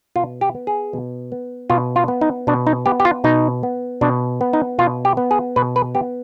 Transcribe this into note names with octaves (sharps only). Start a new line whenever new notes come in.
B2 F4
G4
B3
G#4
B2
B3
B2 F4
F4
B3
D#4
B2 D4
D#4
B3 G4
G4
F4
B2 D#4
B3
B2 D4
B3
D#4
B2 F4
G4
B3
G#4
B2 B4
B4
B3 G4